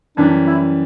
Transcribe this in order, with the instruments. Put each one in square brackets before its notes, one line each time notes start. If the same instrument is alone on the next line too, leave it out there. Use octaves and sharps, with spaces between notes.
[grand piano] F#2 E3 G3 [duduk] D4
[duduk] E4